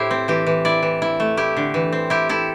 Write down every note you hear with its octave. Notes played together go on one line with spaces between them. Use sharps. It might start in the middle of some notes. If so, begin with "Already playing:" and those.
Already playing: A2 E4 G4 C5
C4
E3 G4
E3
E4 D5
E3
E4
A3
E4 G4
D3
E3
C4
E4 G4
E4 A4